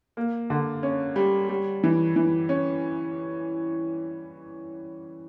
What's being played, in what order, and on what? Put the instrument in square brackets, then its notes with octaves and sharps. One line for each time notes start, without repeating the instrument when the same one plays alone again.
[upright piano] A#3
D3
C#4
G3
G3
E3
E3
C#4